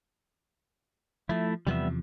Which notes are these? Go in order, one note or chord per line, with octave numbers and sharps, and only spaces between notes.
F3 A3 E4
E2 C3 F3 G3 B3 E5